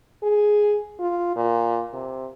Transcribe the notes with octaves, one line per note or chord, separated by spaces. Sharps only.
G#4
F4
A#2
C3